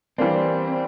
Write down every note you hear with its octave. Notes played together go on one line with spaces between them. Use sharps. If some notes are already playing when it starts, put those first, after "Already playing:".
E3 G3 A#3 C4 D4